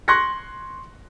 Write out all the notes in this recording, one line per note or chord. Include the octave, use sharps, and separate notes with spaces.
C6 C#6 F#6 G#6 A#6 C#7